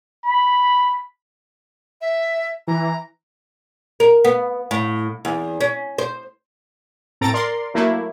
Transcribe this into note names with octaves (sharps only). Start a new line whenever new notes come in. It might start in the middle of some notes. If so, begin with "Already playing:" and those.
B5
E5
E3 A#5
A#4
B3
A2
E2
C#4
C5
A2 C4 A4 A#5 A6 D7
A#4 D5 C6
F#3 A3 A#3 E4